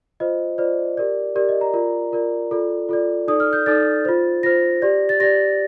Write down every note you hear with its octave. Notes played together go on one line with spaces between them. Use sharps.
F4 C5 D#5
F4 C5 D5
G4 A#4 D5
G4 A#4 D5
D#5
A#5
F4 A#4 D5
F4 A#4 D5
F4 A4 D5
F4 A4 D5
D#4 A4 D5 D#6
F6
G6
D#4 A4 D5 A6
F4 C5
F4 C5 A#6
G4 D5
A6
G4 D5 A#6